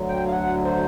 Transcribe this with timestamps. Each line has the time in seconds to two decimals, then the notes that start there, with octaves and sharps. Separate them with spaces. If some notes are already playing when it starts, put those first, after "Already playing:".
Already playing: D2 D3 F#3
0.08 G5
0.27 F5
0.32 F#5
0.65 C5